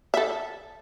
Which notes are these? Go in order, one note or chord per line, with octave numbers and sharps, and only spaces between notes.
A4 E5